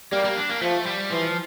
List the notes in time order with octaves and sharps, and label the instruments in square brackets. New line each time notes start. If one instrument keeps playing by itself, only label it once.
[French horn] G3 [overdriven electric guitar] A#3
[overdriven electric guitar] A#3
D4
A#3
[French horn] F3 [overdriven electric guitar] A3
[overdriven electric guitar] G3
[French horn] E3 [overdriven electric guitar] F3